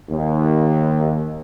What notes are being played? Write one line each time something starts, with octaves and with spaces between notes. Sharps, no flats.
D#2